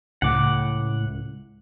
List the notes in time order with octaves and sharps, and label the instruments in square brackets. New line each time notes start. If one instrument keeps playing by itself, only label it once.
[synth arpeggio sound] C#2 [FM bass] A2 [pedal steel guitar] F#5 D6